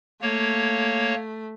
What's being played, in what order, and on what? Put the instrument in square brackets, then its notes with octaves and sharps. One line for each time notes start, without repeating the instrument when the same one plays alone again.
[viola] A3 [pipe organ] A#3 C#5